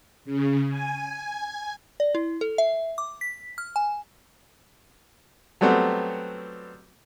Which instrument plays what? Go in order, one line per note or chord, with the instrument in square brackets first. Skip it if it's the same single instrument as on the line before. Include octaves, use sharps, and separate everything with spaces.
[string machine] C#3
G#5
[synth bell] D5
E4
A4
E5
D6
B6
F6
G#5
[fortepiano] F#3 G3 A3 B3 C4 F#4